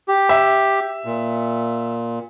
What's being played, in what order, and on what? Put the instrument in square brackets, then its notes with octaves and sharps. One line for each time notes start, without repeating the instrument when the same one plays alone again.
[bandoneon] G4
[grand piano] E5
[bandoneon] A#2